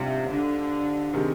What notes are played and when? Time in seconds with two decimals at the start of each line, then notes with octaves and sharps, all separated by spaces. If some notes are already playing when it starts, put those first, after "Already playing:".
Already playing: G#2 C3 G3 D4 F4
0.29 D3
1.13 C3 D#3 G#3